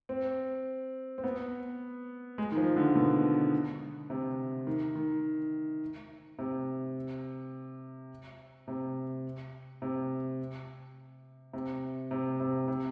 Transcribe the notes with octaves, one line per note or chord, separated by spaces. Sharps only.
C4
C4
B3
G#3
D#3
F3
D3
B2
C3
D#3
D#3
C3
C3
C3
C3
C3
C3
C3